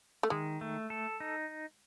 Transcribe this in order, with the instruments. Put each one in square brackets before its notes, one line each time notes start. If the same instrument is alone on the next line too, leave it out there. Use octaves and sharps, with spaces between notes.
[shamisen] A3
[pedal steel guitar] D#3 [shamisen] G#3
[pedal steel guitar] A3
A4
D#4